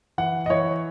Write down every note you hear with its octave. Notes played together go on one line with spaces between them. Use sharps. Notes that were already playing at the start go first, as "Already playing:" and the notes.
E3 F#5
D#5
E3 C#5